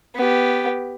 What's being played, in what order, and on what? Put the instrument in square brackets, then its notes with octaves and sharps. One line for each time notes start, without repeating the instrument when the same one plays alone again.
[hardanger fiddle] B3 G4